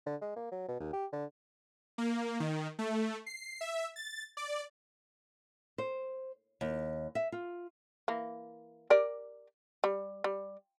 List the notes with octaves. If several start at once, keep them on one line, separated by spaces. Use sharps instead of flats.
D3
G#3
A#3
F#3
B2
D#2
G4
D3
A#3
D#3
A3
C7
E5
A6
D5
C5
D#2
E5
F4
E3 A#3
G4 A#4 D5
G3
G3